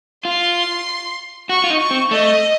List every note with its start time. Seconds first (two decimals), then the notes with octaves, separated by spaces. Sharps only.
0.25 F4 C6
1.49 F#4 C#6
1.64 F4
1.70 D#4
1.80 C#6
1.91 C4
2.11 A3 D#5